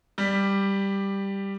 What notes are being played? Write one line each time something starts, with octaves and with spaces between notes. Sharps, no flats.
G3 G4